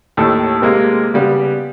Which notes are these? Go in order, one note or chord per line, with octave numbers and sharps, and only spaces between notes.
D#2 A2 A4 A5
C3 G#3 A#3
C#3 G3 B3